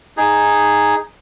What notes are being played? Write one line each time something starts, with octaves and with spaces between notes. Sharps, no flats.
D#4 G#4